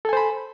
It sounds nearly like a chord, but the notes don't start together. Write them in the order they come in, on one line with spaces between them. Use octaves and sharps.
A4 G#5 C5 B5